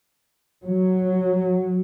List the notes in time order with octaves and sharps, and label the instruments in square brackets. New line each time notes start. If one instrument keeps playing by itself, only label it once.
[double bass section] F#3